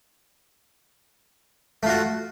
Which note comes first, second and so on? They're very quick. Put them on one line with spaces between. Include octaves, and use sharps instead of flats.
A3 F4 F#4